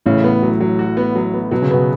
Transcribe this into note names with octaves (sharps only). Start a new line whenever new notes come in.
A1 A2 C#3
B3
F#3
F#3
F#4
B3
F#3
B3
B2 F#3
C#3
B2 B3